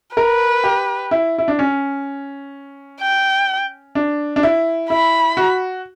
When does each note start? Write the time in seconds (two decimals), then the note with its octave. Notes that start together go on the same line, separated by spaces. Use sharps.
0.17 A#4 B4
0.64 G4
1.11 E4
1.38 E4
1.48 D4
1.59 C#4
3.01 G5
3.95 D4
4.36 D4
4.43 E4
4.90 E4 B5
5.37 F#4